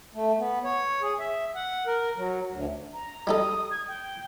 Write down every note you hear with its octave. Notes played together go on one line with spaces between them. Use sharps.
A3
B3
C#5
G#4
E5
F#5
A#4
F#3
D2
A#5
G3 D#4 A4 D#6
G#6
G5